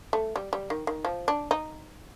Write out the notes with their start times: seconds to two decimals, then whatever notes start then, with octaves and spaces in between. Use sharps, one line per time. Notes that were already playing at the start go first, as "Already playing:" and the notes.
0.13 A3
0.36 G3
0.53 G3
0.70 D#3
0.87 D#3
1.05 F3
1.28 D4
1.51 D#4